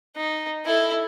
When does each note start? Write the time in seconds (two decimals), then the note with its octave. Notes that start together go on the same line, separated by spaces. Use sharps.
0.17 D#4
0.66 E4 A4